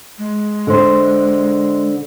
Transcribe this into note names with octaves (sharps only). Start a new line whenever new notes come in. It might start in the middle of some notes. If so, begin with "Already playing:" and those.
G#3
D3 C5